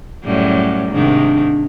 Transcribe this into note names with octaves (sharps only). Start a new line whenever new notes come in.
F#2 A2 G3
G#2 C3 D#3 D4